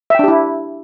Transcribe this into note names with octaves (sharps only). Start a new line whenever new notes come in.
D4 E4 G4 E5 G5